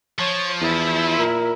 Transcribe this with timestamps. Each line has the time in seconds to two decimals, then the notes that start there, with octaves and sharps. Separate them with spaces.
0.19 F3 C#5
0.61 E2 E4
1.19 A#2 A#4